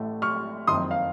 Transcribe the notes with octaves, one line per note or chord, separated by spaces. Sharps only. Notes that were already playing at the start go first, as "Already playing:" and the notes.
Already playing: A1 A2 A3
C#6 F6
F#1 F2 D#3 C6 D#6
F5